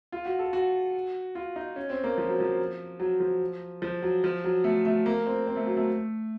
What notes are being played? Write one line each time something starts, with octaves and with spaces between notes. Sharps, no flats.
F4
F#4
A4
F#4
F4
D#4
C#4
C4
A#3
F3
F#3
F3
F#3
F3
F3
F#3
F3
F#3
A3
A3
A#3
C4
C4
A3
F#3
A3